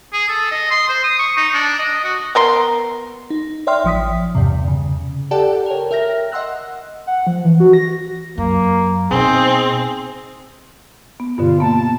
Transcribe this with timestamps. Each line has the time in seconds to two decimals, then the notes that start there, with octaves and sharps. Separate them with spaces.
0.13 G#4
0.29 A4
0.51 D#5
0.71 C6
0.89 C5
1.03 D#6
1.19 C#6
1.37 D#4
1.54 D4
1.79 D#5
2.04 F#4
2.35 B3 A#4 C6
3.30 D#4
3.67 C#5 D5 E5 G5 C6 F6
3.84 A1 F3 D#6 B6
4.35 E2 G2 C3
4.68 C#3
5.31 G4 A4 D5 F#5 G5 A5
5.66 A#4 C#5
5.91 A#4 E5 G5 F6 A#6
6.32 D#5 F#5 C6 E6 F#6
7.07 F#5
7.27 F3
7.44 E3
7.60 F#4
7.73 A#6
8.38 F#2 A#3
9.11 B2 C4 D#4 G#4
11.20 B3
11.38 G2 B2 D3 F4
11.60 A#3 B3 A5